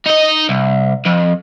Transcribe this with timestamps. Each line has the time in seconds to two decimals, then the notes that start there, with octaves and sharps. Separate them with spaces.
0.06 D#4 D#5
0.49 C2
1.06 F2